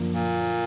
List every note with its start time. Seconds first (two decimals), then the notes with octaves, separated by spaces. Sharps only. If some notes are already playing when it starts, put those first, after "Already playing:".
Already playing: F#2 D3 F3 A#3
0.13 A#2